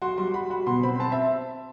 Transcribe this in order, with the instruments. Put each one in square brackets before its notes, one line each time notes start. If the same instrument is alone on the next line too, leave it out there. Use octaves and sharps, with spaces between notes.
[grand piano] F#4 [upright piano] C6
[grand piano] G3 [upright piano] C6
[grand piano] F#4 [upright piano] B5
[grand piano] F#4 [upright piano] B5
[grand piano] B2 [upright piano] C6
[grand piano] C4 [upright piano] B5
[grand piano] C4 [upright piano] A5
[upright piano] E5